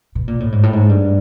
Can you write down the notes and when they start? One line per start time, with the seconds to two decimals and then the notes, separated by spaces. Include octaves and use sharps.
0.15 B2
0.28 A#2
0.40 A2
0.52 G#2
0.63 A2
0.73 G#2
0.89 G2